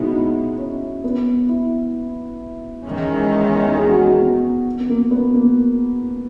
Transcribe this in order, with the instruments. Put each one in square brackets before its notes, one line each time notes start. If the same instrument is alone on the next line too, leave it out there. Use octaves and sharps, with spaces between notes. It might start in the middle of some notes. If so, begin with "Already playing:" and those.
Already playing: [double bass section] B2 G#3 B3 [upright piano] C#4 D#4 E4 F#4
[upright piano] D#4
C#4
B3
E4
[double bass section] E2 D#3 G#3 C#4
[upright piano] G#4
F#4
G#4
B3
B3
A#3
B3
A#3